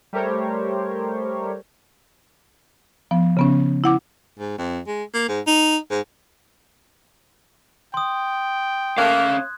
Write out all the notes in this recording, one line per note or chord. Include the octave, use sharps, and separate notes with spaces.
G3 A3 G4 A#4 C5 C#5
F3 B3
C#3 B3 C#4
E4 F#5 D6
G#2
F2
G#3
A#3
G#2
D#4
G#2
G5 C6 D#6
A3 A#3 C#4 F5 F#6 G#6